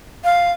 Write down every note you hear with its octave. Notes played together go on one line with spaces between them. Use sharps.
F5